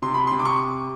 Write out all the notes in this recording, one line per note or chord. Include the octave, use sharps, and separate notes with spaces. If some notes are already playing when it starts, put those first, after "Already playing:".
C3 C6
B5
C6
C3
D6
C#6